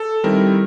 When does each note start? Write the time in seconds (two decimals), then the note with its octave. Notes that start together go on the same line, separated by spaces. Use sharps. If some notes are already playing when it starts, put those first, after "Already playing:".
Already playing: A4
0.24 D#3 G3 C4 E4 A#4